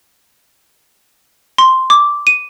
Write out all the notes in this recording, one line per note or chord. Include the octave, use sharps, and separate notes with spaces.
C6
D6
D#7